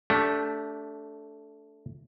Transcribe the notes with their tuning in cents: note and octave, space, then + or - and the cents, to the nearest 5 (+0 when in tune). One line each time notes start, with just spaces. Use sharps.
A3 +0 D4 -25 G4 +0